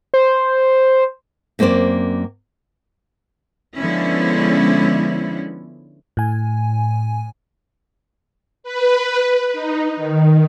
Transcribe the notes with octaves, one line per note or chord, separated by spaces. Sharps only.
C5
F#2 A#3 C4 C5 D5
D3 F3 G#3 B3 C#4 E4
A2 G#5
B4
D#4
D#3